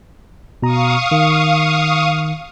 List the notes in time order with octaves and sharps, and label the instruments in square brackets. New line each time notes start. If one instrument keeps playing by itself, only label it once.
[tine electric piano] B2 A#5 [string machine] F5 C#6 D#6
[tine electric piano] D#3